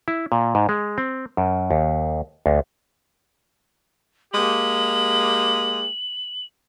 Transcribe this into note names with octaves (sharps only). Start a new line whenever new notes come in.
E4
A#2
G#2
G#3
C4
F#2
D#2
D2
G#3 A#3 G4 F#7